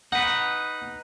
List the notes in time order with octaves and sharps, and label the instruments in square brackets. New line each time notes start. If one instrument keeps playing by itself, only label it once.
[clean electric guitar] D#4 B4 [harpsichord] F#5